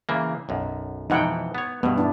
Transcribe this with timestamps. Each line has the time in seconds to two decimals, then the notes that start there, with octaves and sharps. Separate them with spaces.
0.09 C#3 E3 A#3
0.49 B1 F#2
1.10 F2 B2 E3 D#4 F#5 G5
1.55 B3 C#5
1.83 G2 B2 B3
1.98 D4 E4